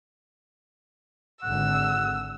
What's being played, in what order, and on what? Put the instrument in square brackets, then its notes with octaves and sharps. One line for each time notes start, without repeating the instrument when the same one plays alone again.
[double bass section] G#1 D3 [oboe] F#5 [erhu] E6